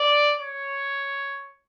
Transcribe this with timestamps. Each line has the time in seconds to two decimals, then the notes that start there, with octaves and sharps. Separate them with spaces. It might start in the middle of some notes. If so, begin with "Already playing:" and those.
Already playing: D5
0.40 C#5